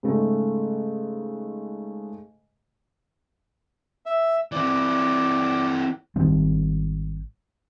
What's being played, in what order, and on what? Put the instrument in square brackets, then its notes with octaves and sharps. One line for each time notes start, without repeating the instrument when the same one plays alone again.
[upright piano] G#2 C#3 A3
[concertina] E5
[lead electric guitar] E3 C4 [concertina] D5
[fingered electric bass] G#1 D#3 G3 C4